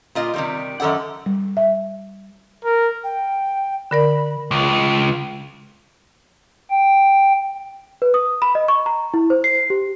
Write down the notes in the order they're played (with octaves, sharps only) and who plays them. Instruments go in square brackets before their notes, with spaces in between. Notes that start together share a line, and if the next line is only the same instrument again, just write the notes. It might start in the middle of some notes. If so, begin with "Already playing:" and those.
[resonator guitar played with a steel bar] A#2 F4 D#5
C3 D#3 G3
F#2 D#3 A4 D5 F#5
[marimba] G3
E5
[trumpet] A#4
[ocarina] G5
[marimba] D3 A#4 D5 [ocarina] B5
[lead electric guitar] C#2
[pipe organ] G5
[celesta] B4
D#6
B5
D#5
C#6
A#5
E4
C5
C7
G4